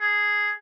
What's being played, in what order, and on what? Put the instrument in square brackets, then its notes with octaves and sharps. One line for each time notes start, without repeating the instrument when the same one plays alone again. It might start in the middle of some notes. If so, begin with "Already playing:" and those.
[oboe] G#4